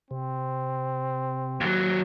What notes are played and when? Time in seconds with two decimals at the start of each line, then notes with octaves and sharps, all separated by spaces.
0.11 C3 C4
1.61 D#2 F#3